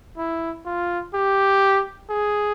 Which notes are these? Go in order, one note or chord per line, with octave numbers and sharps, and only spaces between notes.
E4
F4
G4
G#4